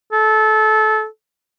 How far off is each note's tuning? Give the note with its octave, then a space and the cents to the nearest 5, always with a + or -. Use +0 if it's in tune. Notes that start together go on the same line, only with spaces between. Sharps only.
A4 -25